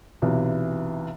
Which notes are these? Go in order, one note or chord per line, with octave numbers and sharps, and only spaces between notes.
B1 C3 E3